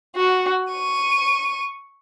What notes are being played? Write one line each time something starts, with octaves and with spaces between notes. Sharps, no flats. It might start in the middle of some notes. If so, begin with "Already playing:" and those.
F#4
C#6 D#7